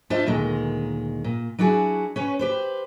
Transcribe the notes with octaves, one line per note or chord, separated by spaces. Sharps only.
D4 F4 C5 D#5 E5 A5
D2 A#2 D#3 G#3
A#2
F#3 D4 E4 F#4 G#4
C#4 B4 C#5
G4 B4 C5